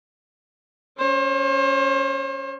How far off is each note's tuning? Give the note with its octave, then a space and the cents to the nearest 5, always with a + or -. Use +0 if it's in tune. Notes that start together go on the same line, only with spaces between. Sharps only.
C#4 +5 C5 +40